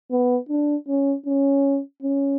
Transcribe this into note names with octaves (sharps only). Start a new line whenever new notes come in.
B3
D4
C#4
C#4
C#4